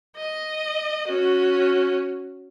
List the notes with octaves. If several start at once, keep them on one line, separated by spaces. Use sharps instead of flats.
D#5
C#4 F#4